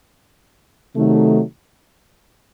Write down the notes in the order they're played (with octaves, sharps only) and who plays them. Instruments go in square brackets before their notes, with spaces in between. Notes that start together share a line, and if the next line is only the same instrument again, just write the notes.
[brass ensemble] C3 D#3 F#3 A3 D#4